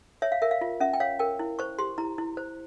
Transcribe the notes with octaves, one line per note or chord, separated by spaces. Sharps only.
C#5 E5
F5
A#4 E5
F5
F4
C#4 E5
G5
C#5 F5
A#4 G5
E4
C5 C#6
G4 C6
E4 A#5
E4
C5